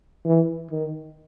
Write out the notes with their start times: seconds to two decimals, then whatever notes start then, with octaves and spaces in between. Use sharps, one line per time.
0.25 E3
0.71 D#3